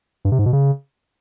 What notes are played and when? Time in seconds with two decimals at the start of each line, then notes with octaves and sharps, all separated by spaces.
0.25 G2
0.32 C3
0.39 G#2
0.46 B2
0.53 C#3